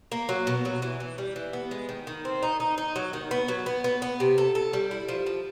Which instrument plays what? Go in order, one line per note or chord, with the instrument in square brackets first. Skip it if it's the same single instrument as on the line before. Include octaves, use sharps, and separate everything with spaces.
[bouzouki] A#3
F#3
B2
F#3
E3
E3
G3
E3
B3
G#3
D#3
D#3
C4
D#4
D#4
D#4
F#3
D#3
B3
F#3
B3
B3
B3
C3
A4
A4
G3
E4
F3
F3